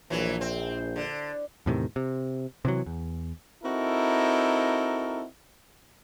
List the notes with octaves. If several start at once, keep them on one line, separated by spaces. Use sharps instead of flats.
A#1 E3 F#3
C4
D3
E2 A2 C3 D#3
C3
C3 E3 F#3
E2
C4 D#4 E4 F#4 A4 A#4